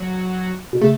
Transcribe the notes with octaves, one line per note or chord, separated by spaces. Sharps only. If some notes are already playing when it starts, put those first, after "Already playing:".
Already playing: F#3
B2
C#3 A3